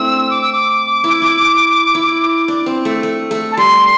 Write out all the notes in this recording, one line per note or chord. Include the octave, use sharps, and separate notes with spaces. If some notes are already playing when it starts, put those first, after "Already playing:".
Already playing: A3 C4 D4 E4 E6
D6
E6
D6
E4
E4
E4
D4
C4
A3
A3
A3
A5
G3 C6